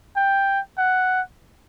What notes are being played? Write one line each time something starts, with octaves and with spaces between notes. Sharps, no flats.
G5
F#5